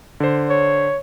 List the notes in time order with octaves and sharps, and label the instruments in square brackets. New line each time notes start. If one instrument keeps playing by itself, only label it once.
[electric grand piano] D3 C5
[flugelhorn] C#5